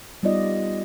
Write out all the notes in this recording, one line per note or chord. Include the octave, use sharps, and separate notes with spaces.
G3 B3 D#4 F4 D5 D#5